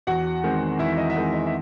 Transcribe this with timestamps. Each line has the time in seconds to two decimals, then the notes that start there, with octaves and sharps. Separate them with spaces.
0.07 E2 F#4 F#5
0.44 D#3 G#3 C4
0.79 E2 E4 E5
0.98 D#5
1.10 E5
1.16 D#3 G#3 C4 D#5
1.34 D#5
1.46 E5